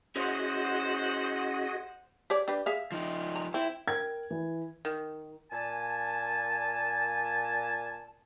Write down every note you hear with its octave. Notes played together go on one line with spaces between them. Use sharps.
C#4 E4 F#4 G#4 C5 D#5 F#5
G4 C#5 D5
D4 G4 B4
G#4 E5 F5
F3 D#4
A#5
C4 E4
A#4 G5 G#6
E3
D#3
A#2 G#5 A5